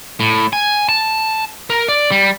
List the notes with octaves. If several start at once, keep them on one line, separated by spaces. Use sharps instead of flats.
A2
G#5
A5
A#4
D5
G3